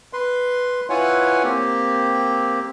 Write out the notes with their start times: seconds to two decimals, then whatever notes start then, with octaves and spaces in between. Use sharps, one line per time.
0.13 B4 C6
0.90 E4 F4 B4 C#5 F#5 G#5
1.44 A#3 C4 G4